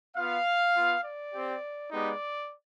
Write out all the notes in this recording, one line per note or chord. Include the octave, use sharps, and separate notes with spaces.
B3 F4 F5
B3 F4
D5
C4 G4
G#3 B3 D#4 G4 D5